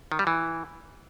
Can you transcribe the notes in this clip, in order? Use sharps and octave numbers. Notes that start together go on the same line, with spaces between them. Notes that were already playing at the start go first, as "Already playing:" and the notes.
D#3
G3
E3